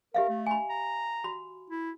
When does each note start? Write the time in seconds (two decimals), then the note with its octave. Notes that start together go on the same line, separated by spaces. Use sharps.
0.14 G4 A#4 E5 F5
0.29 A3
0.46 G#5 B5
0.70 A#5
1.24 F#4 B5
1.70 E4